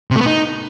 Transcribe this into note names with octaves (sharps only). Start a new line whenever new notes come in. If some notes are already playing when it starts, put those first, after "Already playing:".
C3
A3
B3
D#4